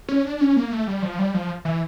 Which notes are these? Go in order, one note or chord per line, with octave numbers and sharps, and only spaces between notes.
C#4
D4
C#4
A#3
A3
G3
F3
G3
F3
E3